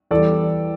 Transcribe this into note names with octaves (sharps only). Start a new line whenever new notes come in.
E2 E3 G3 A4 D5